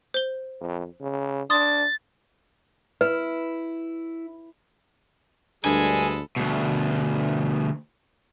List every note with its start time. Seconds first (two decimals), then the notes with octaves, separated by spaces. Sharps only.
0.14 C5 G7
0.61 F2
1.01 C#3
1.50 D4 C6 D#6 A6
3.01 E4 B4
5.65 D2 G2 G#3 A4 G#5 B5
6.36 D2 B2